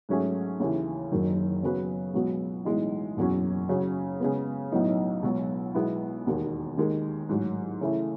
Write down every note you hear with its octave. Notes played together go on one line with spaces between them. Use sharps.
G#2 F#3 A3 C#4 G#4
D#2 C#3 E3
F#1 F#2 D#3 F#3
C#3 F#3 B3 F#4 B4
C#2 B2 F#3 B3 F#4
B1 A2 E3 G#3 D#4
F#1 E2 B2 F#3 C#4
C#3 F#3 C#4 F#4
C#3 G#3 B3
B1 A2 F#3 B3 D#4
C#2 B2 F#3
B1 B2 G#3 B3 E4
E1 D#2 D#3
D#2 D#3 G#3
A1 G#2 F#3
C#3 E3 A3 E4